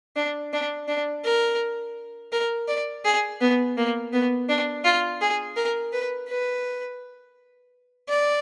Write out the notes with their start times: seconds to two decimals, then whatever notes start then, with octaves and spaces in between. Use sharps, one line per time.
0.16 D4
0.53 D4
0.88 D4
1.25 A#4
2.32 A#4
2.68 D5
3.05 G#4
3.41 B3
3.77 A#3
4.13 B3
4.49 D4
4.84 F4
5.21 G#4
5.56 A#4
5.93 B4
6.28 B4
8.09 D5